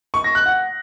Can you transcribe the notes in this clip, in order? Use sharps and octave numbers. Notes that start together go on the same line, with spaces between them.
C#6
A#6
F#6
F#5